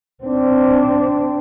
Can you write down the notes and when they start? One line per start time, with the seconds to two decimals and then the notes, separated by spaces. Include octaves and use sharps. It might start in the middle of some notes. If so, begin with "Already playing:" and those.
0.24 C4 D4